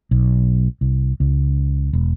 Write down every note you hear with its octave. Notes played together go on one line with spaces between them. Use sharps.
B1
C2
C#2
E1